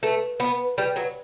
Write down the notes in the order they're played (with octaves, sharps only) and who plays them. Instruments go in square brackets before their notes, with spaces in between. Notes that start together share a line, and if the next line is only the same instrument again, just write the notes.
[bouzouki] A3 [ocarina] B4
[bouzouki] B3
G3
F#3